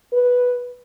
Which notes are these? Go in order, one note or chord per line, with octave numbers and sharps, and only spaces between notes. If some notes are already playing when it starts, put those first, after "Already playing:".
B4